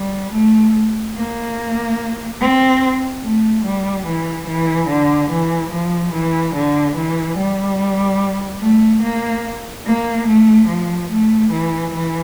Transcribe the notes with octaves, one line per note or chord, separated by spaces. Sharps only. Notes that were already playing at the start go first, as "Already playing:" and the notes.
Already playing: G3
A3
A#3
C4
A3
G3
E3
E3
D3
E3
F3
E3
D3
E3
G3
A3
A#3
A#3
A3
F3
A3
E3
E3